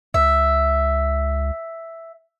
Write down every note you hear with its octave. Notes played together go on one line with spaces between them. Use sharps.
C#2 E5